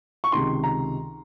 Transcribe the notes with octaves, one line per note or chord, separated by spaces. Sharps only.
C#6
C#2 C3 D#3 C6
A#5